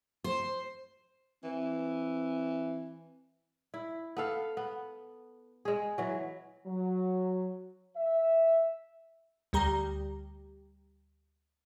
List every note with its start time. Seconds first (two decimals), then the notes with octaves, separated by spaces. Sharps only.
0.24 C5
1.44 E3 C4
3.74 E4
4.17 B3 A4 F5
4.57 B3
5.65 G#3 G#4
5.98 E3 F#3
6.66 F#3
7.96 E5
9.53 D2 G3 G4 A#5